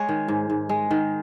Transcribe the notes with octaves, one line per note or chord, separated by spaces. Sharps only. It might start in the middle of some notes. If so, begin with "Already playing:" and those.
Already playing: G#3 C#5
D#3
G#2
G#2
G#3
D#3